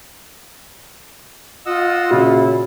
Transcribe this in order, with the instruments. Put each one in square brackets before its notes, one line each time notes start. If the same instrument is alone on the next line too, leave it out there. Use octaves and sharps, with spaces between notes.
[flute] F4 [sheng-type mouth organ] D#5 F#5 E6
[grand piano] A#2 C#3 C#4 [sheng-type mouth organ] E4 [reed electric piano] F#4